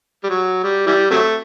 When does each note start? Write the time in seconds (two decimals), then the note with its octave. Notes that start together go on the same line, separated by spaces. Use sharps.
0.24 G3
0.29 F#3
0.64 G3
0.87 E3 G3
1.11 C3 F#3 A3